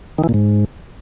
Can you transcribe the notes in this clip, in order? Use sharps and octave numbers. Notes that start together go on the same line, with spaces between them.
D#3
E3
A#2
G#2